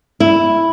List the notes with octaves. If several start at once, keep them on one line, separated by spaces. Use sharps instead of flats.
E4